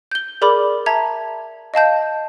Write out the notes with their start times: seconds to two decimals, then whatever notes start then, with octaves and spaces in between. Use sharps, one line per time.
0.11 G6 G7
0.42 G#4 A#4 D5 B5 D6
0.86 E5 A5 A#5 G#6
1.74 D#5 F5 A5 G6